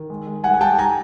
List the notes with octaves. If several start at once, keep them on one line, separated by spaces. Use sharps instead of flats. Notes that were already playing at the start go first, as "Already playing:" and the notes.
Already playing: D#3
G#3
G#3
G3 F#5 G#5
G#5
G3 G5 A5
G#5 A#5